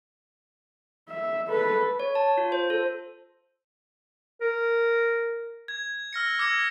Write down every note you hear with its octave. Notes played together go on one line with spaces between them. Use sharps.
E5
A4 B4
C#5
A5
F4
C5
A4
A#4
G#6
E6 F6 A#6 C#7
D6 E6 F6 G#6 A#6 C#7